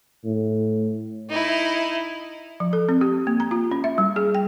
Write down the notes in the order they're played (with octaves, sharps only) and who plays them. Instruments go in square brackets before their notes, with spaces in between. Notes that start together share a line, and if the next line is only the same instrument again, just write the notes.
[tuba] A2
[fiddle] D#4 E4
[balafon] F3
A4
C4
G4
A#3
A#5
F4
C#4
E5
G3
G#4
G5